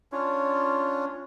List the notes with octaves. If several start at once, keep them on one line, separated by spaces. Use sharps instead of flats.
C#4 D4 F4 C#5